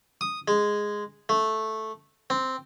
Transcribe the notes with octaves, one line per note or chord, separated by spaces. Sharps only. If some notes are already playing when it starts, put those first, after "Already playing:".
D#6
G#3
A3
C4